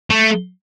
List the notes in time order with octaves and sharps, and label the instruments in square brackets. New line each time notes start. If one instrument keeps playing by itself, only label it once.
[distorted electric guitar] A3